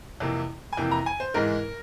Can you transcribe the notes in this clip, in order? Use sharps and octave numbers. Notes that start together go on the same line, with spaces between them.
F2 C3 E3 A#3
G#5
F2 C3 E3 A#3 G5
A#5
G#5
C5
G#2 E3 G#3 A#4